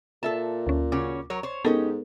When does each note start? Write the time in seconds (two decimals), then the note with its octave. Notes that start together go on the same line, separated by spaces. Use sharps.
0.23 A#2 A4 E5 A5
0.67 D2 C#4
0.92 C#3 C#4 F#4 D6
1.30 F#3 A#4 C#5
1.43 C5 C#5
1.64 G#2 B3 C#4 D#4 G4 A4 A#4